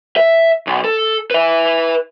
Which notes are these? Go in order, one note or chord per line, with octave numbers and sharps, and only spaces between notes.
E5
B1
A4
B4 E5